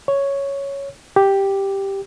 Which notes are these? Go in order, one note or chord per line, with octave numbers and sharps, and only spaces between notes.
C#5
G4